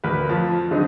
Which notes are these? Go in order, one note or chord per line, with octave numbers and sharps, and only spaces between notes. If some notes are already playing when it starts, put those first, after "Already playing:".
D2 A#4 B4
F2 F3
D3 F#3 C4 D4 D#4